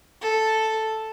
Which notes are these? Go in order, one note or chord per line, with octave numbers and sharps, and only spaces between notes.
A4